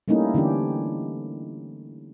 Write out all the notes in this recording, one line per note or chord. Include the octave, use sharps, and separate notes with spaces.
G3 A3 A#3 C#4 D#4 E4
D3 E3 C#4 D4 G4